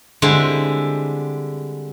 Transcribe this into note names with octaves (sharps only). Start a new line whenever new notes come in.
D3 G3 G#3 C4 E4